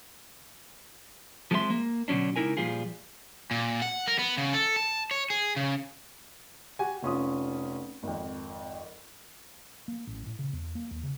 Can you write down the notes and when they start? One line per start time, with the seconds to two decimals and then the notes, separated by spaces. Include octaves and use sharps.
1.51 F3 G#3 C4 A4 E5 C6
1.70 A#3
2.08 B2 D3 F#3 C#4 D4
2.36 C#2 F#3 D#4 E4 A#4 G#5
2.57 A#2 F3 G3 F4 G#4
3.51 A#2
3.82 F#5
4.07 A#4
4.19 B3
4.37 C#3
4.53 A4
4.76 A5
5.11 C#5
5.30 G#4
5.56 C#3
6.79 F#4 G4 G#5
7.03 F1 C#4 F4 D#6
8.03 G#1 F2
9.88 A#3
10.07 A1
10.26 A2
10.39 C#3
10.53 E2
10.75 A#3
10.91 D#2
11.03 C#3